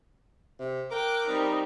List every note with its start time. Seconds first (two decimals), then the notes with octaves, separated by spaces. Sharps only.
0.59 C3
0.91 A#4 G5 D6 F#6
1.27 G3 C4 D#4